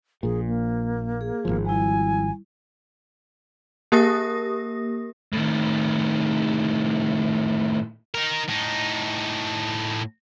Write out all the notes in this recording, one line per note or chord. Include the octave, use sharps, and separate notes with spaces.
A#1 A#2 G#4
A#3
G#4
G#1 C#2 F3
G3 E4 G#5
A#3 G4 A#4 D#6 A#6
A2 D#3
D#4 A#4
A2 D#4